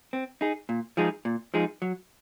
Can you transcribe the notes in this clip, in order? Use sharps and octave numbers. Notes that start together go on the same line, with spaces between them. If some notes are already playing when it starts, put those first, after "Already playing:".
C4
D#4 G#4
A#2
F3 G#3 D#4 G#4
A#2
F3 G#3 D#4 G#4
F#3